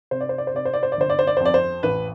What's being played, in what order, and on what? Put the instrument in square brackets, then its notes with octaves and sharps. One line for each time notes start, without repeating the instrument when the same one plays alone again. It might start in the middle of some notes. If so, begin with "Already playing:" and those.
[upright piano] C3 C5
D5
C5
D5
C5
C3 D5
C5
D5
C5
D5
G1 C5
D5
C5
D5
F2 C5
D5
C5
A1 B4